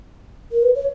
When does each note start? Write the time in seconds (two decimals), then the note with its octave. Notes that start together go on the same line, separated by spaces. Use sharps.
0.51 A#4
0.63 B4
0.75 C#5